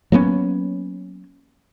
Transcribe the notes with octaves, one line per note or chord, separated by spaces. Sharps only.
F#3 A#3 B3 C#4